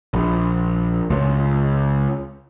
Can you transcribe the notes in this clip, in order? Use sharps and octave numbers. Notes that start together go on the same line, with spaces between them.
A#1
C#2